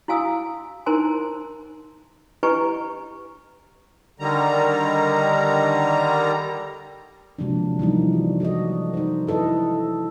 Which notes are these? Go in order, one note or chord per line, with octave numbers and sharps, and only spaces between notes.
E4 F#4 F5 G#5 D#6 E6
D#4 E4 A#4 C5 G#5 C6
E4 G4 B4 D#5 G#5 C#6
D3 D#3 G3 A#5
C3 F3 F#3 G#3 A#3 D4
E3 F3 G3 D#4
F#4
F#4 A4 D5 D#5
D#4 C5
E4 A4 B4 D#5